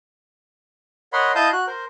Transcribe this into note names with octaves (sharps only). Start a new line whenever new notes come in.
A#4 C#5 D#5 F#5 B5 C6
E4 D#5 F5 A5 D#6 G6
F#4 F#6
A#4 C5